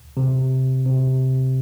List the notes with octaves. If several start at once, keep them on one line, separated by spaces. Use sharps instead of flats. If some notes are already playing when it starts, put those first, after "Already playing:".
C3
C3